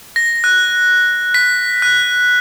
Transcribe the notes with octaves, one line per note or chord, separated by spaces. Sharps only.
A#6
F#6
B6
F#6